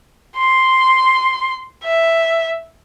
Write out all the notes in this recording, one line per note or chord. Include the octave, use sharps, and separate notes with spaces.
C6
E5